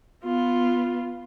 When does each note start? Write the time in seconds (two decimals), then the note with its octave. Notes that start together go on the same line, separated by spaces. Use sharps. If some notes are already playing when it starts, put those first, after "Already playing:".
0.24 B3 F4